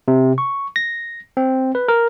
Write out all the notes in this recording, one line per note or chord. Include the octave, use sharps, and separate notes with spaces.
C3
C#6
A#6
C4
B4
A#4